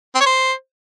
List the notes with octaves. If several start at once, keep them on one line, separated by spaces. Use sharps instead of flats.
C4
C#5
C5